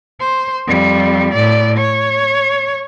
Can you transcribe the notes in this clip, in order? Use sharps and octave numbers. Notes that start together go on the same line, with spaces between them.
C5
F2 G3
A2 D5
C#5